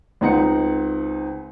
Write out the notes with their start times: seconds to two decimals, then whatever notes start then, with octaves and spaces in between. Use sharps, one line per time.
0.21 C#2 C4 D#4 F#5 C#7